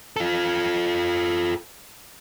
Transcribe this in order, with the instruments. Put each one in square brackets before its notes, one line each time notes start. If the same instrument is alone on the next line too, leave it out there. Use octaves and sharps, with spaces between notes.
[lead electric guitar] F4 A4